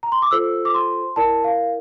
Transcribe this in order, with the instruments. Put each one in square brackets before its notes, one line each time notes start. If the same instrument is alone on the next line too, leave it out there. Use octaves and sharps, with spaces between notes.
[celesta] A#5
C6
D6
F4 A4 C5 E6
D6
C6
E4 A#4 D5 A5
F5